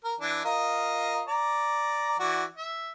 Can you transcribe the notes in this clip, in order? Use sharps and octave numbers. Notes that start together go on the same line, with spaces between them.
A#4
E3 D4
F4 A#4 D#5
D5 A#5
E3 F#4 D5
E5